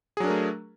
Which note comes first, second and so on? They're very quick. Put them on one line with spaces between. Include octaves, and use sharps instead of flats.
G#4 F#3 D4 A#4 A3